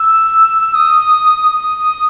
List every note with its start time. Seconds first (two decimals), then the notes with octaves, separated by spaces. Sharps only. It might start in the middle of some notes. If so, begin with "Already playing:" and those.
Already playing: E6
0.75 D#6
1.51 D#6